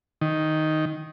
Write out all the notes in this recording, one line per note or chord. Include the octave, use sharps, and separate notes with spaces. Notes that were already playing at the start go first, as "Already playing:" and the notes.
D#3